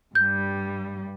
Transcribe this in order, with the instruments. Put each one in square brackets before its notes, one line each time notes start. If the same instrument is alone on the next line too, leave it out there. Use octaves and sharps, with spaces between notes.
[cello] G2 G3 [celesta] G6